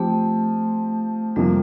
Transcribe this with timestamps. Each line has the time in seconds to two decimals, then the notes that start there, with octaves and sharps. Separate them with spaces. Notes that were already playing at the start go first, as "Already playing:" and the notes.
Already playing: F3 A3 C4 G4
1.36 F2 C3 F3 G3 A#3